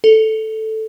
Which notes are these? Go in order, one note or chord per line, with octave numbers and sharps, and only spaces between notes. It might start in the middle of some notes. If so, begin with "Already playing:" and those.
A4